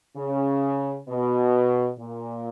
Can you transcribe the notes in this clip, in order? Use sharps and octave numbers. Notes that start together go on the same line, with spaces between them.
C#3
B2
A#2